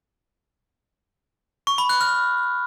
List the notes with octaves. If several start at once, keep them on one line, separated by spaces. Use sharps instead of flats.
C#6
B5
F#6
F6